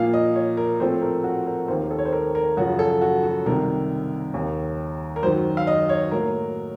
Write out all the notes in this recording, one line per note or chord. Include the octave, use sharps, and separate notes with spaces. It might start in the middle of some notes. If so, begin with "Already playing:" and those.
Already playing: A#2 F3 A#3 F5
D#5
C#5
A#4
A2 F3 A3 C4 C5
A#4
F#4
A#4
D#2 D#3 A#3 C5
A4
C#5
C5
A#4
A#4
F#2 C#3 F3 F#4
A4
F#4
F#4
C2 C3 D#3 A#4
D#2 D#3 A#3
A#4
F#2 D#3 F#3 C5
F5
D#5
C#5
A2 F#3 A#3 A#4